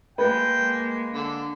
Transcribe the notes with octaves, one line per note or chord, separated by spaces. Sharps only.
G#3 A#3 B4 G5
D3